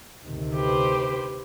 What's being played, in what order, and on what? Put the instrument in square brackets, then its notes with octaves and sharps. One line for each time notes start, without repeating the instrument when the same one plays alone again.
[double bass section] D2 C3 D#3
[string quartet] G4 B4 C5